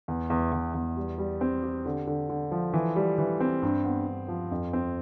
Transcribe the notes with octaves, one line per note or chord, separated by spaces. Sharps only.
E2
E2
E2
E2
G3
G3
C4
G4
D3
D3
D3
F3
E3
G3
E3
C4
G2
B3
G2
F3
F2
C4